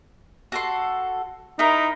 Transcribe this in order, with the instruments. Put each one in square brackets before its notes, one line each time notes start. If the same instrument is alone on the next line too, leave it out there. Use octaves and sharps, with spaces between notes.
[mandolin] F#4 A4 C6
[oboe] D#4 [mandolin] E4 A#4